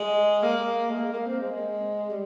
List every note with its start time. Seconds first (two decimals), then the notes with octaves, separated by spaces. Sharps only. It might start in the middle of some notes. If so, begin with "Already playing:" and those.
Already playing: G#3
0.42 A#3
0.89 G#3
0.98 A#3
1.12 A#3
1.26 C4
1.40 G#3
2.10 G3